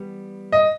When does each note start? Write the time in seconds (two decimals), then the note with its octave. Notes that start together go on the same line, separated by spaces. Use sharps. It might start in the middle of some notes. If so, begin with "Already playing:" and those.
Already playing: E3 G3 B3
0.52 D#5